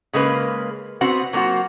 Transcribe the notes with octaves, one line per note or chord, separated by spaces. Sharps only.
C#3 G#3 A#3 B4
B3 C4 F#4 F#5
F#3 A#3 C4 F4 F#4